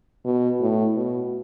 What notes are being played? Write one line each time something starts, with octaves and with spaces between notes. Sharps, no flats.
B2
A2
B2